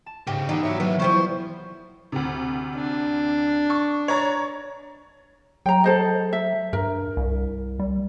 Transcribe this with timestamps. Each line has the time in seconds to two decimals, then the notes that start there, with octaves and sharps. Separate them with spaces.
0.06 A5
0.27 G#2 C#3 G4 A#6
0.49 E3 B3 D#4 G4 D5 F#5
0.63 F#4 C#5 E5
0.80 D#3 F#3 B3 B4
1.00 F3 G3 E4 C5 C#6
2.12 D2 C3
2.76 D4
3.70 C#6
4.08 C#5 A#5 A6
5.66 F#3 G5 A#5
5.84 A4 C5 D#5
6.33 E5
6.73 G2 A#4
7.17 C2
7.80 G3